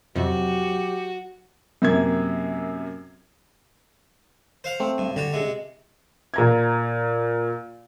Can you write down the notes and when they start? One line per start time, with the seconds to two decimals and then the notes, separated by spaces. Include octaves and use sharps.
0.16 F2 C3 F#3 F#4 G4
1.82 F#2 C3 A#3 G#6
4.64 C5 F5 F#5
4.80 A3 C4
4.98 G2
5.16 D3 F#4 G4
5.33 C3 G#3
6.34 A#2 A#5 G#6